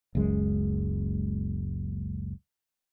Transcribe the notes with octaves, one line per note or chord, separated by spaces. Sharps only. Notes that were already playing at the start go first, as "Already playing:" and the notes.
F#1 C#2 F#2 G#3